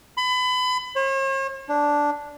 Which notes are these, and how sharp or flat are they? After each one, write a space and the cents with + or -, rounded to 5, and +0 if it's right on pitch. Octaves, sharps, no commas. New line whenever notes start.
B5 +30
C#5 -45
D4 -5